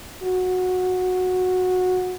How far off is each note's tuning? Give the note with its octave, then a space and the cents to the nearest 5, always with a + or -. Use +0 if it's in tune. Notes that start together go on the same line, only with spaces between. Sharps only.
F#4 -15